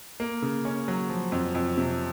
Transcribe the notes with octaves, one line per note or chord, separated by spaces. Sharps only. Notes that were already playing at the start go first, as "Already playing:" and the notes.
A#3
C#3
C#4
F#3
F3
F2
F2
C3